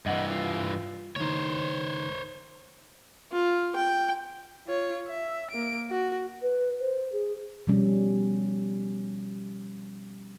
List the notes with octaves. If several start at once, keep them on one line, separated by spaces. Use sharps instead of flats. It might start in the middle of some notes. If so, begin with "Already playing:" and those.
G2 E3 D#5 F#5
F4
C#2 D#3 C5 C#5
F4
G5
F4 C#5
E5
A#3 D7
F#4
B4
C5
G#4
B2 F3 G3 C#4